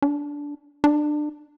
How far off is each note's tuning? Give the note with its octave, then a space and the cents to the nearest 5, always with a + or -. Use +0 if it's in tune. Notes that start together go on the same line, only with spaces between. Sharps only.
D4 -15
D4 +25